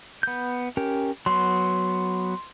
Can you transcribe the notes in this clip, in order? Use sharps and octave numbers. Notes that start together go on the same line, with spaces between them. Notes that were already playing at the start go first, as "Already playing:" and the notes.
B3 G6
C#4 G4 A#4
F#3 B3 C6